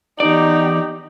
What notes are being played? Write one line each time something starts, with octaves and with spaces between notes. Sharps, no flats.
E2 D#4 G4 D5